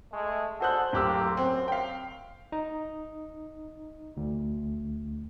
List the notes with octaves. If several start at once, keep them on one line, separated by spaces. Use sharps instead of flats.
G#3 A3
D3 F#4 G#4 A4 C5 F#6
D1 A#3 C4 G4 E6
F#2 C4
F5 G5
D#4
D2